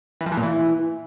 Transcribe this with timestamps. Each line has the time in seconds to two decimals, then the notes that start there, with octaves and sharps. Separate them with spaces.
0.21 E3
0.26 F3
0.32 E3
0.37 A#2
0.43 E3